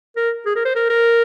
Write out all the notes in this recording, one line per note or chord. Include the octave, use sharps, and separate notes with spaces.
A#4
G#4
A#4
C5
A#4
A#4